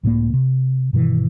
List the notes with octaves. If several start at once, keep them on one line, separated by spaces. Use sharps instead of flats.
C#2 A2 F#3 A#3
C3
G2 B2 D#3 E3